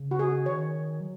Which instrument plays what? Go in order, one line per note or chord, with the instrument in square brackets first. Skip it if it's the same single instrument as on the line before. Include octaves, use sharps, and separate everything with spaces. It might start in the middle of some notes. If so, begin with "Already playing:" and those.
Already playing: [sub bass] C#3
[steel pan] F#4
G#4
[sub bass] D#3 [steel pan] C#5
[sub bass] F#3